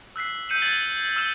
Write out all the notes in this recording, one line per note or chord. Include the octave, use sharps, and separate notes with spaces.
E6 F#6 B6 C7
E6 G6 C#7 D#7 E7 F#7
G#6 A6 F#7 G7
E6 F6 E7 F#7